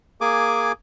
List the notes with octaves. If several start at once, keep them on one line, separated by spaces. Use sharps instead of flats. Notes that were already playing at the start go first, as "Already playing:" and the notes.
A#3 G#4 G#5 D6